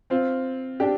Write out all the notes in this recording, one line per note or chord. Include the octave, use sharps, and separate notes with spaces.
C4 F4
D4 G4